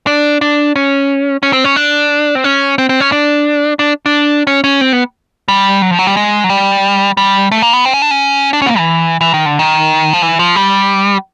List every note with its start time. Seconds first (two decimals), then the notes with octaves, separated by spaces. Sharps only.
0.07 D4
0.41 D4
0.76 C#4
1.43 C#4
1.53 C4
1.64 C#4
1.76 D4
2.35 C4
2.44 C#4
2.78 C4
2.89 C4
3.00 C#4
3.12 D4
3.79 D4
4.06 D4
4.47 C#4
4.64 C#4
4.81 C4
4.93 B3
5.48 G3
5.82 F#3
5.91 F3
5.99 F#3
6.07 G3
6.17 G#3
6.44 F#3
6.49 G3
7.17 G3
7.51 A3
7.62 A#3
7.73 B3
7.85 C4
7.94 C#4
8.02 D4
8.11 C#4
8.53 D4
8.62 C#4
8.66 B3
8.69 A#3
8.78 E3
9.21 E3
9.34 D#3
9.46 D3
9.59 D#3
10.14 F3
10.22 E3
10.39 F3
10.56 G3